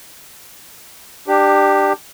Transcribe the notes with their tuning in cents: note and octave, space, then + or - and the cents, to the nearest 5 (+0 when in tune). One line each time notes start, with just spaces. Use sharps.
D4 +20 G4 +0